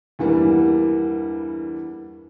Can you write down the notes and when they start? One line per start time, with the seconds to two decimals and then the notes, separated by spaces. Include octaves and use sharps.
0.19 E2 G2 E3 G3 A#3